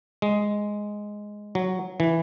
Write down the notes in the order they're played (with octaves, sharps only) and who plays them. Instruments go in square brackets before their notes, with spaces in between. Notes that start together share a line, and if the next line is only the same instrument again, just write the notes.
[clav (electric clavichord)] G#3
F#3
E3